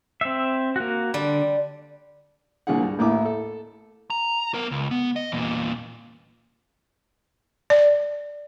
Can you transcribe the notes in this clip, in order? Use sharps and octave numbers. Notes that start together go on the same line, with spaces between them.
C4 E5
A#3 F#4
D3 G3
C2 A#2 D3 G#4 F#5
G2
A1 D#2 A2 E4 D6
A4
A#5
B3 A#4
C#2
B3
D#5
E2 A#2
D5